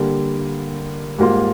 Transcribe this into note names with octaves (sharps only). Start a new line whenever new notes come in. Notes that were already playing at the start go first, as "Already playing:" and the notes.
Already playing: D3 G3 A#3
G#2 G3 A#3 F4